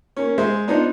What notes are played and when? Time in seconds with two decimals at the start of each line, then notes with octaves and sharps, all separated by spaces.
0.17 A#3 C#4
0.38 G#3 C5 E5
0.68 B3 D4 D#4 F4 C5